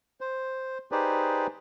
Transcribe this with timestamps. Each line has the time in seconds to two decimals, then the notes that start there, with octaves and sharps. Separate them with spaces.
0.21 C5
0.92 D#4 G4 G#4 B4 C5 D5